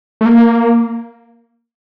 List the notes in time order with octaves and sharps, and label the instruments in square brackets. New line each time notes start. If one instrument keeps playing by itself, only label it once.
[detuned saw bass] A3
A#3